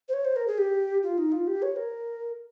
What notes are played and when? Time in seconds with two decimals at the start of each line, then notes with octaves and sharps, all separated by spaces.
0.09 C5
0.13 C#5
0.25 C5
0.36 A#4
0.47 G#4
0.58 G4
1.03 F4
1.18 D#4
1.32 F4
1.47 G4
1.62 C#5
1.76 A#4